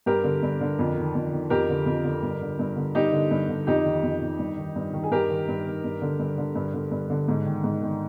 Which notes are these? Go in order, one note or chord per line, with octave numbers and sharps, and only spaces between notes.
G2 G4 A#4
D3
G2
D3
F2
D#3
F2
D#3
F2 G4 A#4
D3
F2
D3
G2
D3
G2
D3
G2 D#4 G4
D3
G2
D3
F2 D#4 G4
D#3
F2
D#3
G2
D#3
G2
D#3
G#4
G2 G4 A#4
D#3
G2
D#3
G2
D3
G2
D3
G2
D3
G2
D3
G#2
D#3
G#2
D#3